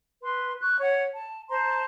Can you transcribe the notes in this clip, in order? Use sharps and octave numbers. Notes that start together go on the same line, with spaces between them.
B4 C6
C#6 F#6
C#5 F#5
A5
C5 A5 A#5 C6